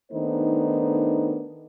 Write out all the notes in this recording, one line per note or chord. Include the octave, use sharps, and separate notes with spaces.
D#3 A3 B3 D4 D#4 C5